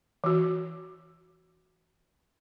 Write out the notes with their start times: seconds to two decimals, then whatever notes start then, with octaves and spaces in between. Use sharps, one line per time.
0.24 E3 F#4